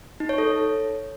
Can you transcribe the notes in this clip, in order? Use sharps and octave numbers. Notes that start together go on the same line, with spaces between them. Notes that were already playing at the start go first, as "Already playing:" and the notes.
D#4
C#5
A4